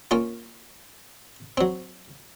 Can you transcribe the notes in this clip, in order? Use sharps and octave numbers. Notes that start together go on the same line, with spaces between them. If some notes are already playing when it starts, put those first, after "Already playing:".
A#3 C#4 F4
F#3 C4